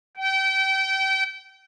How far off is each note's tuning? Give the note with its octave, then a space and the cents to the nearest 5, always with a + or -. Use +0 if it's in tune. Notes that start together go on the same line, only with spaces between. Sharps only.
G5 -30